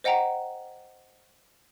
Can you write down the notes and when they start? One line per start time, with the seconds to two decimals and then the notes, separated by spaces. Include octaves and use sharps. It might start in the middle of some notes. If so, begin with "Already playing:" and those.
0.04 C5 D#5 F#5 G5 A#5